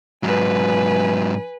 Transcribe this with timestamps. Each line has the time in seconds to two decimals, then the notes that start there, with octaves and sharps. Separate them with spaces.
0.23 G#2 F#3 B4 G#5